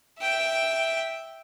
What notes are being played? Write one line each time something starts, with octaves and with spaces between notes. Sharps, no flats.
E5 G5